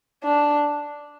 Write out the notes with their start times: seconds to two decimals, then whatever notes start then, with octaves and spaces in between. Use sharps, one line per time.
0.23 D4